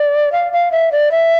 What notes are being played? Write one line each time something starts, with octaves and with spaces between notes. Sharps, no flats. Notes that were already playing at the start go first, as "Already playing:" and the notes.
Already playing: D5
F5
F5
E5
D5
E5